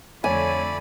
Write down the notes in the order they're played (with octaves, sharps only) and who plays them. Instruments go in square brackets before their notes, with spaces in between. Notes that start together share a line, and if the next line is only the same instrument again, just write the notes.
[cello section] F2 D3 A3 [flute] C#5 [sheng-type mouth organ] D5 B5 [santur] G#5